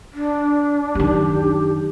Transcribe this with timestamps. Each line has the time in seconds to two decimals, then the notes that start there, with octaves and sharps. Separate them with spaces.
0.14 D4
0.95 F#2 D#3 G4